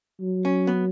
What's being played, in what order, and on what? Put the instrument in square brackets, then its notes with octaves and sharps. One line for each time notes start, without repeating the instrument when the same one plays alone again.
[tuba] F#3
[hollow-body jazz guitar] C#4
B3